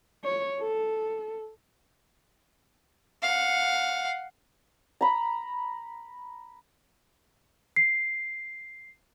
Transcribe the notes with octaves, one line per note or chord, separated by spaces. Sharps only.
C#5
A4
F5 F#5
A#5 B5
C7